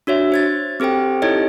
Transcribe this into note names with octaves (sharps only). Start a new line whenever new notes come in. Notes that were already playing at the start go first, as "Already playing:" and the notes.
D4 F#4 C#5 E5
C5 G#6 A6
C4 G4 A4 C5 G5
D#4 E4 G4 A4 C#5 D#5